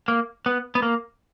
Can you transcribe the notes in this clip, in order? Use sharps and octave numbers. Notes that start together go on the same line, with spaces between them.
A#3
B3
B3
A#3